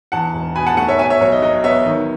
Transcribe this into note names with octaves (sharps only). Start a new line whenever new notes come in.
E2 F#5 A5
E1
B2 G#5 B5
F#5 A5
A3 F#5 A5
C#5 E5
B2 E5 G#5
C#5 E5
B1 C#5
D#5
F#3 D#5
B3 C#5 E5
D#3